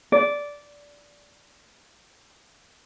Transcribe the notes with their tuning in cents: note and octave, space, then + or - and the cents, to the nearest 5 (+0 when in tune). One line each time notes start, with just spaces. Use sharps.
D5 -15